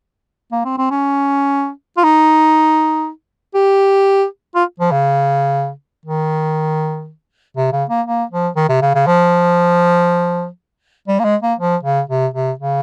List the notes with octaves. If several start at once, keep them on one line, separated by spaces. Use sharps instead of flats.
A#3
C4
C4
C#4
F4
D#4
G4
F4
F3
C#3
D#3
C3
C#3
A#3
A#3
F3
D#3
C3
C#3
C#3
F3
G3
A#3
G#3
A#3
F3
C#3
C3
C3
C#3